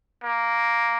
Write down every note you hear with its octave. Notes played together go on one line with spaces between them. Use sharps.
A#3